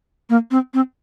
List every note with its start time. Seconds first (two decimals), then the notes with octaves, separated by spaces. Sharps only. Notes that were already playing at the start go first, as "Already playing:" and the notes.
0.30 A#3
0.51 C4
0.74 C4